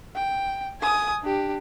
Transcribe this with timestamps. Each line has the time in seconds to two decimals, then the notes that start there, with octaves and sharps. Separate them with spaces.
0.15 G5
0.81 G#5 D#6
1.23 D4 G4